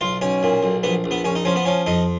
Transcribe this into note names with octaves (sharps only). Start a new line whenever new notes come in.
B1 F4
B1 C#4
A#2
B1
A#1 B3
A#1
B3
A#1 C#4
D#4
F3 C#4
B3
F3 C#4
F2 D#4